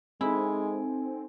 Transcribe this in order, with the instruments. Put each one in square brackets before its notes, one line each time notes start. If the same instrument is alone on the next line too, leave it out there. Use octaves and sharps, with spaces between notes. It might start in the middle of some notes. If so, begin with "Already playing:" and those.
[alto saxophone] G#3 [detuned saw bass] C4 [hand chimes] D#4 A4 G#5 [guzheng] E4